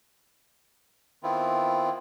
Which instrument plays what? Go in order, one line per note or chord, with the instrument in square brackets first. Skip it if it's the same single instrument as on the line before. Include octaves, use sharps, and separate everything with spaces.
[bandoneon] D#3 B3 C4 E4 F4